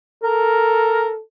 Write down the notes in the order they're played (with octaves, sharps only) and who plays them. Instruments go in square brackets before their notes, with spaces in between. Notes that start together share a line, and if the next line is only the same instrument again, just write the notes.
[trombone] A4 [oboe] A#4